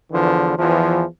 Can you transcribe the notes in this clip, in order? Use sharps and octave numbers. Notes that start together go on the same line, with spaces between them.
E2 D3 E3 F3
E2 E3 F3